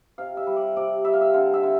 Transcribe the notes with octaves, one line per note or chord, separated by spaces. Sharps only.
C3 F5
E5
G3
D5
C3 D5
G3 E5
F5
E5
D3 F5
E5
D3